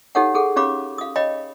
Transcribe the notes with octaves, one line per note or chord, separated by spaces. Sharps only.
D#4 G4 A4 C#5 F5 F#5
G#4 A4 F#5
C#4 G4 C#5 F5 B5 D6
F5 D#6
C#5 D#5 F5 G5 B5